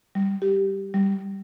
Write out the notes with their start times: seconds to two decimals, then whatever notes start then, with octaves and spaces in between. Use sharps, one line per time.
0.15 G3
0.42 G4
0.94 G3